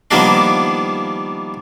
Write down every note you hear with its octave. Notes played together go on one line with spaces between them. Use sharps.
D#3 F3 G3 A#3 B3 D4